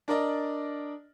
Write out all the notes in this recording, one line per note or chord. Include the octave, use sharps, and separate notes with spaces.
D4 A#4 D5 D#5